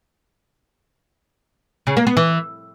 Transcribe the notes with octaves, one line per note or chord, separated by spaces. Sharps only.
C#3
A#3
B3
E3